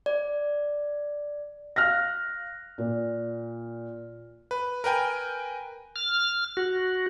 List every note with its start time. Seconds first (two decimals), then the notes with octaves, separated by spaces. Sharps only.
0.06 D5
1.76 F5 F6 F#6 A#6
2.78 A#2
4.51 B4
4.84 A#4 B4 G5 G#5
5.96 F6
6.57 F#4